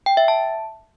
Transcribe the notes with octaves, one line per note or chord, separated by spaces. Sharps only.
G5
E5
A5